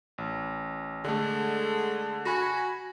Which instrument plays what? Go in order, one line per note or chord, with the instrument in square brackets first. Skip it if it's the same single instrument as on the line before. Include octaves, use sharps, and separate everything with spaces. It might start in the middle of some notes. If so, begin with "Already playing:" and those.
[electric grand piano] A1
[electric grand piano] D3 A3 [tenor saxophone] G#3
[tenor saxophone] F#4 [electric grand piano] G#5 B5 A#6